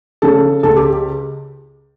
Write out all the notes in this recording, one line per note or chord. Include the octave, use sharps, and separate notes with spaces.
C#3 A4
C#2 A4
G4